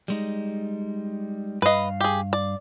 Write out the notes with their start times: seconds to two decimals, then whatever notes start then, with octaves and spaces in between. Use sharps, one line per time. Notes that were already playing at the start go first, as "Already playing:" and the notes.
0.08 G3 G#3 D#4
1.62 G2 B4 D#5 F5
2.01 G4 G#4
2.33 D5